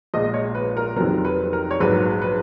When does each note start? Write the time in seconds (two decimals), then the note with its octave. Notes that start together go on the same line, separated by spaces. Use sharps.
0.14 A#1 A#2 G#3 D#5
0.34 C#5
0.55 B4
0.77 A#4
0.96 F1 F2 D#3 F#3 A#4
1.25 B4
1.53 A#4
1.71 C#5
1.80 A#1 G#2 F#3 B4
2.22 B4